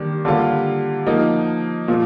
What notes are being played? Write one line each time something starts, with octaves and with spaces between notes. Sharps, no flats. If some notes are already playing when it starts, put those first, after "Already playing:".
Already playing: D#3 G3 A#3 D4
D3 G3 A#3 F4
F3 A#3 D#4
A#2 F3